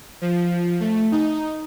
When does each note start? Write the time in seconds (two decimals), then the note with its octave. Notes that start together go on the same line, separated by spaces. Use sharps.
0.21 F3
0.80 A3
1.12 D#4